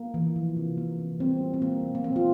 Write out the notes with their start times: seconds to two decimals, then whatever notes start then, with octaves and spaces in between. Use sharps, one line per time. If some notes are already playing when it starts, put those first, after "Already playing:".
Already playing: A#3
0.14 E3
0.36 F3
0.56 C3
0.77 A#3
0.99 C3
1.19 G3 C4
1.41 A#2
1.54 C4
1.62 A#3
1.83 A#2
1.95 A#3
2.04 F3 C4
2.16 F4